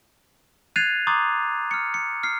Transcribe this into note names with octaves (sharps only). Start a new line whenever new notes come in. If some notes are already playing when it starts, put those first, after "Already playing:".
F#6 G#6 A6 C7 D#7 F7
A#5 C6 D6 D#6 G6 A6
F6 C#7
C#7
F6 C7